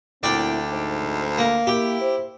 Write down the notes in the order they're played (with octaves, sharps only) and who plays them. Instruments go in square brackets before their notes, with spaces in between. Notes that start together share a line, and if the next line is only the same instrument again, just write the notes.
[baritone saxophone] D2 [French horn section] A#2 C4 E4 [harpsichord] D5 G5
[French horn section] G#2 D#4 C5
[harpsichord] A#3
[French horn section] A#3 [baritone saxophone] E4 [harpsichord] G4
[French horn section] C5